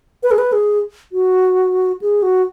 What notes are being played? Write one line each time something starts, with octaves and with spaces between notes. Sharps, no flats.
B4
G#4
B4
G#4
F#4
G#4
F#4